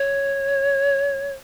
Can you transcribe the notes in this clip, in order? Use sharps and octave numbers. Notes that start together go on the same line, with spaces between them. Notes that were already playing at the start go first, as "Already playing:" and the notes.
Already playing: C#5